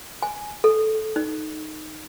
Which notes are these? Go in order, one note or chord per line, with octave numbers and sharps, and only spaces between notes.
G#5
A4
D#4